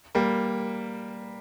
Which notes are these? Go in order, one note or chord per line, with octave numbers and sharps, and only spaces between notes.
G3 A#3